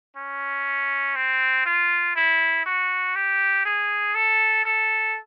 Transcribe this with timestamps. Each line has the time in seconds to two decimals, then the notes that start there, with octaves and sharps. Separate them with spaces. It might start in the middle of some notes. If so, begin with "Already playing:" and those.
0.16 C#4
1.16 C4
1.66 F4
2.16 E4
2.66 F#4
3.15 G4
3.65 G#4
4.15 A4
4.65 A4